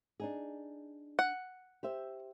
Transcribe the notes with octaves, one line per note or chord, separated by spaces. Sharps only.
D4 D#4 G#4
F#5
G4 C5 E5